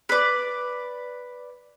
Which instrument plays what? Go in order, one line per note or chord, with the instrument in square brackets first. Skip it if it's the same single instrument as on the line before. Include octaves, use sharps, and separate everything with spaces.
[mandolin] B4 D5